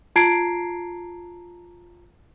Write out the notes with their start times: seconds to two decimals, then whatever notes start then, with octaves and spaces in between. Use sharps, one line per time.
0.16 F4 A5 A#5 G#6 C7 D7